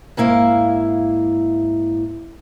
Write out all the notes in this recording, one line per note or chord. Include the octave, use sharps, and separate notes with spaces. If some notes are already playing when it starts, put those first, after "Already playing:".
G#2 A#3 E4 F5